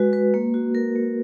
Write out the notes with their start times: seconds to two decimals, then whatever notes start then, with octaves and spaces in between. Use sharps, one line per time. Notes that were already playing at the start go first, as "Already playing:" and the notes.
Already playing: G#3 F#4 B4
0.13 B4
0.34 A#3
0.54 F#4
0.75 A#4
0.96 A#3